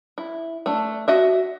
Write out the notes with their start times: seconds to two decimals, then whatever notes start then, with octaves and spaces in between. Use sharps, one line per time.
0.18 E4
0.66 A3 D4
1.08 F#4 D#5 E5